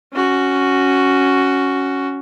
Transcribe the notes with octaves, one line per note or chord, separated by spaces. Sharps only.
C#4 F#4